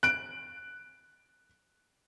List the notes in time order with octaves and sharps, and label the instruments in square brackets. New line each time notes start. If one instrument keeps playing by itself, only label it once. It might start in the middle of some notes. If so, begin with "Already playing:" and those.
[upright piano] F#6 D7